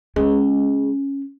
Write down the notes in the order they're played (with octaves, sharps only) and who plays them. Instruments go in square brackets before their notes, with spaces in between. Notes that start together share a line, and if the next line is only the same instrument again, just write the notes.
[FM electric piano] G#3 [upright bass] C#4